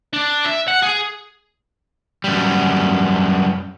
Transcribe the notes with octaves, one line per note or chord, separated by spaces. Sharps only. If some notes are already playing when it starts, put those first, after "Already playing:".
D4
E5
F#5
G#4
F#2 G3